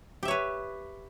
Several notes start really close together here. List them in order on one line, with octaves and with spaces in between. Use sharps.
G4 E5 C#5 B4